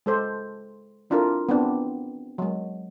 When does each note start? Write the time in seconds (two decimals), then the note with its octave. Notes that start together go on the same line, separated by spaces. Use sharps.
0.06 G#3 A4 C5
1.10 C4 D4 E4 F4 A4 A#4
1.49 B3 C4 D4
2.38 F#3 G#3